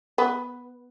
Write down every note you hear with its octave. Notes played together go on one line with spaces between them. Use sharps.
B3